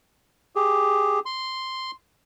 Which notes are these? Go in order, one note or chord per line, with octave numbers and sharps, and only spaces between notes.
G4 G#4
C6